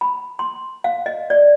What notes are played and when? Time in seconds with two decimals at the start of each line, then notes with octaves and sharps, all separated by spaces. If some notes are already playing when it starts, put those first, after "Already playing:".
0.01 B5
0.39 C6
0.84 F5
1.06 D#5
1.30 D5